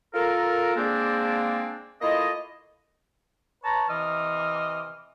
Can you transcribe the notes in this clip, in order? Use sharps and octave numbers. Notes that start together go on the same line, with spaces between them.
F4 A4 A#4
G#3 A#3 C4 D4
A3 A#3 E4 F4 D#5
B4 C#5 A5 A#5
C3 E3 D#5 D6 F6